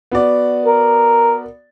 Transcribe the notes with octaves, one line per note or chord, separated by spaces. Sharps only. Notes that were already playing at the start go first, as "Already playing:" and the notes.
B3 F#4 D5
A#4